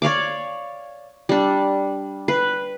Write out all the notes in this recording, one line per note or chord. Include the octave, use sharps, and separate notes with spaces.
C#5 D5 F5 D6
G3 D4
B4